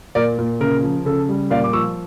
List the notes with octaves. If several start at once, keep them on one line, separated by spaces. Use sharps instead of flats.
A#2 A#4 D5
A#2
C#3 A#4
F3
C#3 A4
G3
A#2 D5 F5
D6
F3 C#6 E6